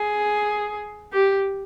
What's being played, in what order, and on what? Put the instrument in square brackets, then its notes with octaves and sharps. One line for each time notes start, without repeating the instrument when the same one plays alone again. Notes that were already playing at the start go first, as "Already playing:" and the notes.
Already playing: [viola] G#4
G4